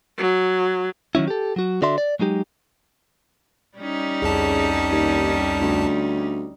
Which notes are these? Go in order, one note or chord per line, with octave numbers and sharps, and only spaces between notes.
F#3
D#3 F#3 C#4 E4
G4 A4
F#3 F#4
D3 F#4 D5 E5 C6
D5
F#3 G#3 D#4 G4
G3 C#4 D#4
C2 F2 C#3 A5
D#2
D2